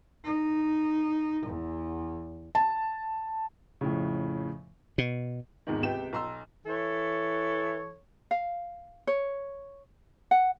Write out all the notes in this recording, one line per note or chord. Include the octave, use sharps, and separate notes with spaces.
D#4
E2
A5
F2 A2 C#3
B2
G#1 E2 G#2 C3 D#3
C#2 C3 B3 G4 G5 E7
B1 A#5 C6 E6
E3 A4 C#5
F5
C#5
F#5